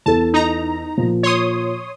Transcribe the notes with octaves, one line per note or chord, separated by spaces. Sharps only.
E2 A4 A5
D#4 A#5
A#2 F3
C#5 C6 D#6